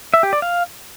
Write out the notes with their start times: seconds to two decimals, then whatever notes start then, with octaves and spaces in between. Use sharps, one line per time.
0.14 E5
0.23 G4
0.33 D5
0.42 F5